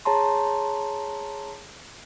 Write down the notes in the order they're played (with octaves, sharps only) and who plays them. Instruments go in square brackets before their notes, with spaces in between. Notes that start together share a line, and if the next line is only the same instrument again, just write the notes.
[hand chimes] G#4 C#5 A5 A#5 C6